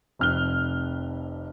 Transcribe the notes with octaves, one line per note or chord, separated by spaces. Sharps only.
F1 F2 F6 F#6 G7